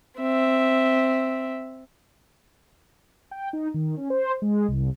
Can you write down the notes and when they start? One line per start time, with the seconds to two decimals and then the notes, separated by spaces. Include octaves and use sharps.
0.19 C4 E5
3.31 G5
3.53 D#4
3.74 D#3
3.97 C#4
4.10 C5
4.42 G#3
4.68 C2